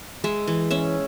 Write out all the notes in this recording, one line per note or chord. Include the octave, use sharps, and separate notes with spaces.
G#3 E5
E3
C#4 E5